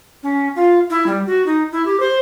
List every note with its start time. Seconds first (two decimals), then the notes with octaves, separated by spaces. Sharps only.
0.23 C#4
0.56 F4
0.90 E4
1.07 G3
1.27 F#4
1.46 D#4
1.72 E4
1.86 G4
2.00 C5